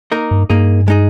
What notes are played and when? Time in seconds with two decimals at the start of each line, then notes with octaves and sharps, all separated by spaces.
0.12 A#3 D#4 A#4
0.31 G2
0.50 G2 A#3 D#4 G#4
0.88 G#3 D#4 G#4